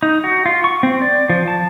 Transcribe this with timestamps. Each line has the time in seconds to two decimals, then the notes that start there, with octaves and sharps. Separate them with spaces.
0.03 D#4
0.24 F#4
0.46 F4
0.64 C#6
0.83 C4
1.02 D5
1.30 F3
1.48 A5